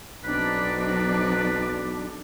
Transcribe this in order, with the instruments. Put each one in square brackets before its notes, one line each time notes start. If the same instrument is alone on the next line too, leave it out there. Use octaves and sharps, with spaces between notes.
[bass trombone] B1 [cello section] F#3 C4 D#4 [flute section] D4 [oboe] B4